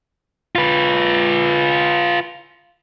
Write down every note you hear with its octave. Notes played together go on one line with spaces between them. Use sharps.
F4 B4